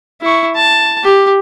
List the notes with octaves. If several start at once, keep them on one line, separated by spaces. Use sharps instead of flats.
E4 C#6
A5
G4